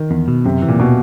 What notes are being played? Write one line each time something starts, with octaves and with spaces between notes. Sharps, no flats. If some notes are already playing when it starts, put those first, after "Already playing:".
Already playing: D#3
E2
B2
F#2 C3
E3
A#2
B2